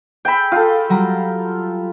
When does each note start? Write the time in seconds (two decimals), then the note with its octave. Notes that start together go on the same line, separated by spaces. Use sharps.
0.25 G#4 G5 B5 E6
0.52 F4 A4 D#6 C7
0.89 F#3 G3 A#5